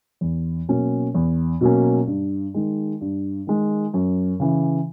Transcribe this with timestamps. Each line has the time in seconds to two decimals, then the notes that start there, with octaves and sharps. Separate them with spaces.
0.21 E2
0.68 B2 F#3 A#3 C#4
1.14 E2
1.61 B2 F#3 A#3 C#4
2.07 G2
2.54 D#3 G#3
3.01 G2
3.47 D#3 G#3
3.93 F#2
4.40 C#3 E3